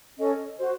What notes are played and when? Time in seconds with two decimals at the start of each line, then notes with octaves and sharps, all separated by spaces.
0.17 C#4 A4 C#5 D#5
0.58 F#4 C5